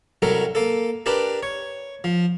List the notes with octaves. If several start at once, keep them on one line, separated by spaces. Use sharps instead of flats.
C2 F#3 G3 A4 A#4
A#3 A4
D4 G4 A#4 B4 A5
C#5
F3